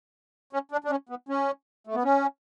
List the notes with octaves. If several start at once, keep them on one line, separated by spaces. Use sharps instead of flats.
C#4
D4
D4
C#4
B3
C#4
A3
B3
C#4